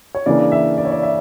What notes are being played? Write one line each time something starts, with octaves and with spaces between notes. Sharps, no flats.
C#5
C#3 E3 A#3 D4 D5
E5
D5
C#5
D5
E5